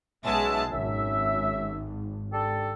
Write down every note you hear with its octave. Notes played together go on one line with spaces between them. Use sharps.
B1 G#3 B3 C#4 E5 A5
G#1 F#2 E5
D4 G4 A4